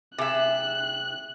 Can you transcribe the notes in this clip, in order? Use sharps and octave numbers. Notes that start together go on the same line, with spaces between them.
C3 G#4 E5 F#6